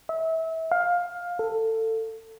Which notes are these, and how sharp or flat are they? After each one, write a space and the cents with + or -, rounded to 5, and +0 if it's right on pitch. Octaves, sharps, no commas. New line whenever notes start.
E5 -30
F5 +15
A4 +20